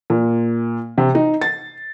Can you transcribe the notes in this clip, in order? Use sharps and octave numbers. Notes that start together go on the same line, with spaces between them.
A#2
C3
D#4
A6